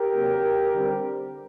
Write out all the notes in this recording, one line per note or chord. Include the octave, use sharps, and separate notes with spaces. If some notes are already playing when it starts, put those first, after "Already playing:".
Already playing: G4 A#4
C3 F#3 A#3
D3 G3 C4